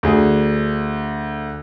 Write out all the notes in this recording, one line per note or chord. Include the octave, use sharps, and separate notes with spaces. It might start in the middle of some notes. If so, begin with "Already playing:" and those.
D2 G#4